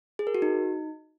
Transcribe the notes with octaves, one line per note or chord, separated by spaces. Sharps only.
G#4
A#4
F#4
D#4